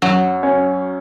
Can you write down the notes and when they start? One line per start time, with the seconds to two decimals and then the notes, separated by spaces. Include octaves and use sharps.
0.02 F#2 F#3
0.43 C#4